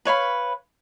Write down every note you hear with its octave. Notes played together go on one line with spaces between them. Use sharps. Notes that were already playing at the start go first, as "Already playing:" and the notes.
B4 C#5 F5 B5